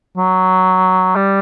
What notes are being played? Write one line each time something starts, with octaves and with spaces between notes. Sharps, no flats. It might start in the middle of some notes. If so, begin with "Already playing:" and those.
F#3
G3